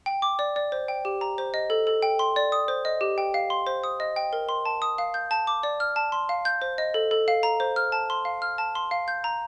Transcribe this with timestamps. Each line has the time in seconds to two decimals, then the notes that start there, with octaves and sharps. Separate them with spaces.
0.06 G5
0.22 D6
0.39 D5
0.56 D5
0.72 C5
0.88 G5
1.05 G4
1.21 A#5
1.38 C5
1.54 D#5
1.70 A4
1.87 A4
2.02 G5
2.19 C6
2.36 D5
2.52 D#6
2.68 C5
2.85 D#5
3.01 G4
3.18 G5
3.34 F5
3.50 C6
3.67 C5
3.84 D#6
4.00 D#5
4.16 G5
4.33 A#4
4.49 C6
4.66 A5
4.82 D#6
4.98 F5
5.14 G6
5.31 A5
5.47 D6
5.63 D5
5.80 F6
5.96 A5
6.12 C6
6.29 F5
6.45 G6
6.62 C5
6.78 D#5
6.94 A4
7.11 A4
7.28 F5
7.43 A#5
7.60 C5
7.76 F6
7.92 A5
8.10 C6
8.25 F5
8.42 F6
8.58 A5
8.75 C6
8.91 F5
9.08 G6
9.24 A#5